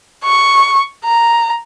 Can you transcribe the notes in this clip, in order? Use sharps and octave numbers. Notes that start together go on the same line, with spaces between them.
C#6
A#5